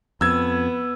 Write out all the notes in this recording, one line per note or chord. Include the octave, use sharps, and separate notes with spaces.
F2 B3 E6 G#6